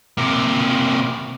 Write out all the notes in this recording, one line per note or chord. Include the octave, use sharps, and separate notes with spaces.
C3 A#3